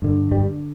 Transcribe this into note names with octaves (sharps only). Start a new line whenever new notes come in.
G2 D3
G2 G3